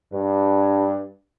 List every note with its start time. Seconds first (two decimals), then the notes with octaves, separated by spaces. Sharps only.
0.12 G2